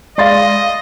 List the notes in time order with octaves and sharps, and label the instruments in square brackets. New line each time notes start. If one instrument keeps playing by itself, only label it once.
[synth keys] G#3 F5 [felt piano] D5 C6 A6 [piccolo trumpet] D#5